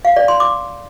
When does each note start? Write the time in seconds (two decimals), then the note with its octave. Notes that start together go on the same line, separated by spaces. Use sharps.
0.05 F5
0.16 D5
0.28 C6
0.40 D6